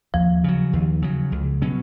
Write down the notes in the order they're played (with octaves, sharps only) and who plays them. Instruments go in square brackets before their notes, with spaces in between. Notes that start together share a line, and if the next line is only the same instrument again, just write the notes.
[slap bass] D#2 [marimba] F3
[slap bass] C#3 F#3
D#2
C#3 F#3
C#2
B2 F#3 C#4